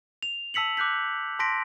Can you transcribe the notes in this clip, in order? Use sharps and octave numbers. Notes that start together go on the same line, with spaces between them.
F7
A5 E6 B6 C#7 F#7
D6 F#6 G6 B6
A5 C6 A#6 B6 D7